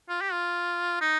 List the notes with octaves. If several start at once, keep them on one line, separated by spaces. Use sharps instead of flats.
F4
G4
F4
D#4